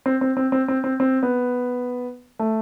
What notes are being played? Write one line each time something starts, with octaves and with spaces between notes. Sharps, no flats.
C4
C4
C4
C4
C4
C4
C4
B3
A3